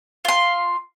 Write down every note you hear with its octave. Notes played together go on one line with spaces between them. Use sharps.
F4 C6